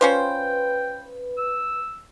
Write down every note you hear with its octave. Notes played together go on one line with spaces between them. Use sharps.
C#4 F4 B4 C5 G5
E6